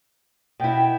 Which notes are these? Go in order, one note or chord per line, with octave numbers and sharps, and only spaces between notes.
B2 E4 G5